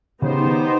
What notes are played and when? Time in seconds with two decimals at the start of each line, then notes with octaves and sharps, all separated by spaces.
0.22 C#3 B3 D#4 G4 C5
0.45 D#3